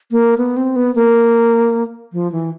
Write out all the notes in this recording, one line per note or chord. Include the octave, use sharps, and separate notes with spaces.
A#3
B3
C4
B3
A#3
F3
E3